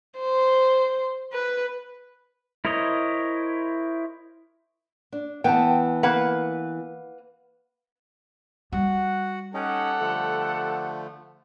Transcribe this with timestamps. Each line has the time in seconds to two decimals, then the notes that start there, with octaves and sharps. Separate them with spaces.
0.19 C5
1.33 B4
2.65 E4 A#4 C5 C#5 D#5
5.12 D4
5.44 E3 B3 G5 A5
6.03 A#3 B4 F#5
8.72 G3 F#4 F#5
9.54 C#4 D#4 G4 A4 F#5
10.00 D3 F3 A3